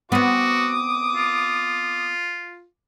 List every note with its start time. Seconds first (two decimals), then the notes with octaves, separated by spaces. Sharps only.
0.12 B3 C4 F#4 D6 D#6
1.15 F4